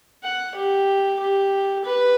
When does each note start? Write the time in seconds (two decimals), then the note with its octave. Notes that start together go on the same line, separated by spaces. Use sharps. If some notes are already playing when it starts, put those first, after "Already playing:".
0.24 F#5
0.56 G4
1.20 G4
1.85 B4